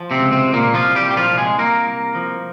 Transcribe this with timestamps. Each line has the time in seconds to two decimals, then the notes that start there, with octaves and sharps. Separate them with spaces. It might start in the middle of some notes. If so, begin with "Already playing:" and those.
Already playing: F3
0.11 C3 C4
0.18 C#2
0.32 C3 C4
0.46 C#2
0.53 A#2 A#3
0.74 C2 F3 F4
0.95 G3 G4
1.03 A#2
1.11 G4
1.17 F3 F4
1.30 C2
1.38 G#3 G#4
1.59 C2 A#3 A#4
1.87 C2
2.15 F3